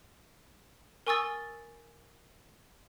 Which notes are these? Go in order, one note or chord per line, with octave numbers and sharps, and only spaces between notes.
A#4 G#5 C#6 D#6 E6 A6